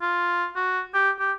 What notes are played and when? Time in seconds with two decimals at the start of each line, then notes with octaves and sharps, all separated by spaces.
0.02 F4
0.56 F#4
0.94 G4
1.19 G4